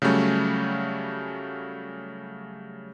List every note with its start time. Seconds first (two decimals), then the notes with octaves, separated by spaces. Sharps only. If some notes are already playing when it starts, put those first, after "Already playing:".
0.02 C#3 F#3 G3 A3 C#4